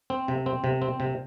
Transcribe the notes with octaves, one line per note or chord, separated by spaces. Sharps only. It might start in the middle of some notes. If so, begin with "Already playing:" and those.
C4
C3
C4
C3
C4
C3